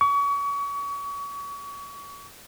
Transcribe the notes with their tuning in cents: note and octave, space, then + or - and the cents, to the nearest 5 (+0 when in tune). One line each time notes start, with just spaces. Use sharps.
C#6 +35